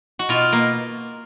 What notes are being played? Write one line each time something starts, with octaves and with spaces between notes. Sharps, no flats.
F#4
B2 F4
A#3